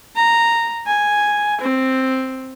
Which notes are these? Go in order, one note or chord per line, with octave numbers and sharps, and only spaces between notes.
A#5
G#5
C4